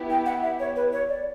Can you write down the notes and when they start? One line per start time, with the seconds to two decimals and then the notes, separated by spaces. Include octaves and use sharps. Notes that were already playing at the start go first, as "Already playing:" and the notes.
Already playing: B3 E4 G4
0.10 G5
0.26 F#5
0.43 E5
0.60 C#5
0.76 B4
0.92 C#5
1.09 D5